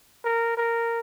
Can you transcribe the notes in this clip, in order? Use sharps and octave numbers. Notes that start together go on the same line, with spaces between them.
A#4
A#4